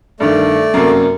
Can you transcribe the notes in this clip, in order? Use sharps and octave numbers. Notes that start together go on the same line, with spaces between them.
G2 D#3 A3 D5
F#2 C3 A#3